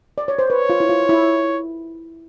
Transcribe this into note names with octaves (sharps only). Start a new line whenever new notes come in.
D5
C#5
C5
B4 C#5
F4
E4
F4
E4